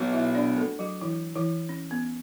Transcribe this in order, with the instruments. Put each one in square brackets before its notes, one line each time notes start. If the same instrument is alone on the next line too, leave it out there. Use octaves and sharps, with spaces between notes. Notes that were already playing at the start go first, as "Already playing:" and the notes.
Already playing: [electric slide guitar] F#3 B3 F#4 C#5
[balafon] E4 E5
D4 D5
A3 A4
F#3 F#4
E3 E4
E3 E4
C#4
B3